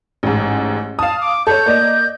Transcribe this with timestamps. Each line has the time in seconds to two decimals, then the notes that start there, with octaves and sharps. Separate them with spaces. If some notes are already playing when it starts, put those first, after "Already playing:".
0.23 A1 G#2
0.99 F5 A5 D#6
1.21 D6
1.47 A4 C#5 G6
1.66 A#3 D5 D#5